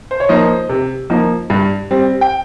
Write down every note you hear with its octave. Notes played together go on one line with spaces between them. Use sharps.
C5
C#5
F3 A#3 D#4 C5 D#5
C3
F3 A#3 D#4
G2
G3 C4
G5